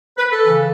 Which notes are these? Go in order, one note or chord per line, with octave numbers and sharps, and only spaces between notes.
B4
A4
C#3 E3